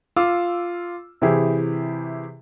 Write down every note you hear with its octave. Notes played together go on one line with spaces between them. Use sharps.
F4 D6 E6
C3 E3 E4 G4 G#4